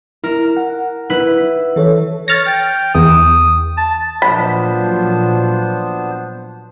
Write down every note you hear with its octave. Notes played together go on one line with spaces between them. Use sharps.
E4 A#4
F#5
E4 B4
E3 A4 C#5
C#5 F6 A6 A#6
G5
E2 D#6
A5
A#2 F3 F#3 B3 D4 C5 B5